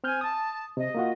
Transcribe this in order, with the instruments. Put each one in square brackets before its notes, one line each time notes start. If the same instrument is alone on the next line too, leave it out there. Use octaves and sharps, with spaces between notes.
[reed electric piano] C4 F6 G6 [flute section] G#5
[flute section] A5 [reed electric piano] D#6
[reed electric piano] C3 [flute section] D#5
[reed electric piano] A#3 F4 F#4